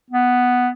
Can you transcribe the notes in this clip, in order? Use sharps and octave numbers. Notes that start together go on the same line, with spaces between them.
B3